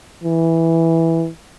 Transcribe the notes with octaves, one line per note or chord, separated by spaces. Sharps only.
E3